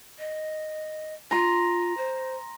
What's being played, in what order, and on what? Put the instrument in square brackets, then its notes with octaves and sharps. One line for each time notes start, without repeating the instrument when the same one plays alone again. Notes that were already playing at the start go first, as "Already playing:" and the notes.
[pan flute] D#5
[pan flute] F4 [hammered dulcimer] A#5 C6
[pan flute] C5